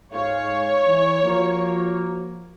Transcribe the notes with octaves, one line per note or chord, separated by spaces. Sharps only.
G#2 G#3 C#5 F5
E3
F3 A#3 F#4